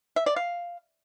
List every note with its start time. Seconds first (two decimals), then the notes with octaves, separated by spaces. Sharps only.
0.16 E5
0.26 D5
0.36 F5